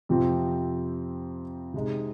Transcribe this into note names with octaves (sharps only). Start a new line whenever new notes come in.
F2 C3 F3 C4
C3 G#3 D#4